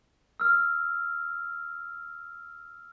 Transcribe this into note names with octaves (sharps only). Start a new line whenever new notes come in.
E6 F6